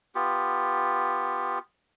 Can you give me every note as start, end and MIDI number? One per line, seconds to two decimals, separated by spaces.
0.15 1.59 59
0.15 1.59 65
0.15 1.59 67